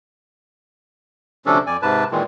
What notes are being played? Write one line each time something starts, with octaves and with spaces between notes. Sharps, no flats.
D2 C3 F3 C#4 D4 A4
F2 D5 G#5
G#2 C3 B4 A5
A#2 D#3 E3 G#3